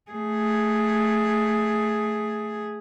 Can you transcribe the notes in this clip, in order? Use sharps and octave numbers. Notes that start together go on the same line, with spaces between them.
A3 G#4